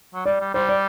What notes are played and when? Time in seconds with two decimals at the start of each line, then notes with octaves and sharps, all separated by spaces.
0.14 F#3
0.26 G3 D5
0.40 G3
0.54 G3 C5
0.69 D5